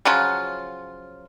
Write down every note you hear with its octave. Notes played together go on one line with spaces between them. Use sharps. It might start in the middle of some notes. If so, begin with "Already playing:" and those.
C#3 F3 F#3 F4